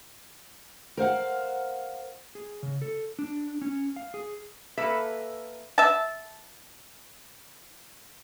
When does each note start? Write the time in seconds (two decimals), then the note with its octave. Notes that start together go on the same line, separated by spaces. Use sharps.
0.97 A#4 C5 F5 F#5
2.35 G#4
2.63 C#3
2.82 A4
3.19 D4
3.62 C#4
3.96 F5
4.14 G#4
4.77 A#3 A4 B4 E5
5.78 E5 A5